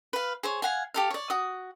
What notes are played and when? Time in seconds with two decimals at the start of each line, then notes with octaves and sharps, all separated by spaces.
0.13 B4 F5
0.43 G#4 C5 C#5
0.62 F5 F#5 G#5
0.94 G4 A4 F5
1.10 C#5 D5
1.30 F#4 D#6